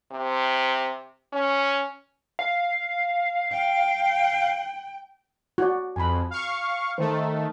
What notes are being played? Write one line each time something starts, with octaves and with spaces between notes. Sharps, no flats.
C3
C#4
F5
G5
F#4 D5
F2 G#5 B5
F5 C#6
D#3 A3 C5